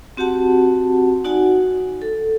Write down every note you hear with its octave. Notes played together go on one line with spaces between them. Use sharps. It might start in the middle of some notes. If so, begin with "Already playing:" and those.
C4 F#4 G4 F#5 A5
D#4 F#4 D5 F#5 G#5
A4